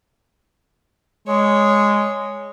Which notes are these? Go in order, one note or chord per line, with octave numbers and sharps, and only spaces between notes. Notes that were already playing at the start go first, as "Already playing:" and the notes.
G#3 C#5